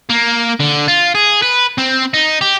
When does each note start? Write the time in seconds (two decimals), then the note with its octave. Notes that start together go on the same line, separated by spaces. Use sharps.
0.10 A#3
0.60 D3
0.88 F4
1.15 G#4
1.42 B4
1.78 C4
2.14 D#4
2.41 G4